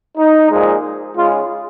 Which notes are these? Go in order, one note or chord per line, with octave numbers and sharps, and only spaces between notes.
D#4
A#2 F3 G#3
C#3 G#3 F4